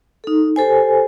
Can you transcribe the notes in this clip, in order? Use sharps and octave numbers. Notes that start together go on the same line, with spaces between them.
D#4 A4
G4 A4 C5 G#5